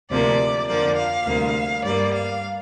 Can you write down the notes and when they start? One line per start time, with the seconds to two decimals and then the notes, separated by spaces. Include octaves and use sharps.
0.10 D2 C3 F3 A#3 D5
0.68 F2 D3 F3 A#3 D5
0.97 F5
1.26 D2 C3 G3 A#3
1.84 G2 G3 A#3 D5
2.13 F5